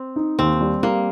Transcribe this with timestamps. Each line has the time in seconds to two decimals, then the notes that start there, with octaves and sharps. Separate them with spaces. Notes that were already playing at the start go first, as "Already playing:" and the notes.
Already playing: C4
0.16 D#4
0.39 D#2 C4
0.61 G3
0.83 G3 A#3